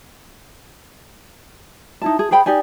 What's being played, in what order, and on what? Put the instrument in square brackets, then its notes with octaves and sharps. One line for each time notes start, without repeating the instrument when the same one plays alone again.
[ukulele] D#4 E4 A5
G#4
G#4 C5 G5 B5
D#4 G4 D5 G#5